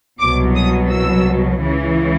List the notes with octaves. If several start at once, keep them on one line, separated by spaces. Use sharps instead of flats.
C2 B2 F#3 D6
D#6
E6
C#2 C#3 E3